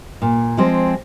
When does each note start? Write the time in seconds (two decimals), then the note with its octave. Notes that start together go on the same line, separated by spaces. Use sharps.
0.22 A#2
0.57 F3 G#3 C4